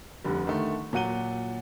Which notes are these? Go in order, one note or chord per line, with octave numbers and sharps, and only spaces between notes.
F1 D3 G3
D3 D#3 A3
A#2 F#3 F#5 D#7 G7